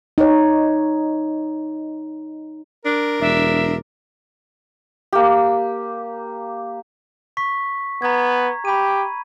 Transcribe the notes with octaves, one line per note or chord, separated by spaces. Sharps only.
D#4 C#5
D4 A#4
E1 D4 E5
A#3 G4
C#6 B6
B3 A#5 G#6
G4 B5 D#7